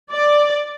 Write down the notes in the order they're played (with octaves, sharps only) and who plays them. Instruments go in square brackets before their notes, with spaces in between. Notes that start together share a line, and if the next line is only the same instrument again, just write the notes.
[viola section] D5